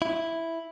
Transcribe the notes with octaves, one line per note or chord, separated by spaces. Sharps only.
E4